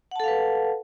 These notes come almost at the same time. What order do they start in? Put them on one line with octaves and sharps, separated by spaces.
F#5 A5 A4 F5 B4